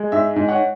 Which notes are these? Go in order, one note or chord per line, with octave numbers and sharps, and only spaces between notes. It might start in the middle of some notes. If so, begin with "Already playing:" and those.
Already playing: G#3
G#2 E5
G#2
C#5 F#5